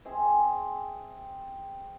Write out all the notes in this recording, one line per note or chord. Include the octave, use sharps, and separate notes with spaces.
C4 G#4 E5